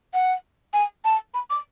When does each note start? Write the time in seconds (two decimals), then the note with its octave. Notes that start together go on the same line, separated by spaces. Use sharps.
0.14 F#5
0.74 G#5
1.05 A5
1.34 B5
1.50 D6